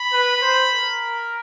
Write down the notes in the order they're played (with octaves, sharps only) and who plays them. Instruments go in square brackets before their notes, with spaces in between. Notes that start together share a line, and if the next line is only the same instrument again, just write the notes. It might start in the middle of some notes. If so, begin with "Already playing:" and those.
Already playing: [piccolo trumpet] B5
[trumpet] B4
C5
A#4